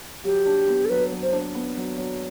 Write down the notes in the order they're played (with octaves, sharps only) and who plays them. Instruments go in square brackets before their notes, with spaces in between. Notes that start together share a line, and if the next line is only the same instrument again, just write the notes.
[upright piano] F#3 [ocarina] G4
[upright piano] D4
B3
[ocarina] A4
[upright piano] F#3 [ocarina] B4
[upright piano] F#3
[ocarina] C5
[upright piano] D4
B3
F#3
F#3